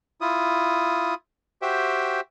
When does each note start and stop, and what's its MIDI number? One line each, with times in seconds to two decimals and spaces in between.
0.21 1.14 64
0.21 1.14 65
0.21 1.14 87
1.62 2.21 66
1.62 2.21 67
1.62 2.21 72
1.62 2.21 76
1.62 2.21 79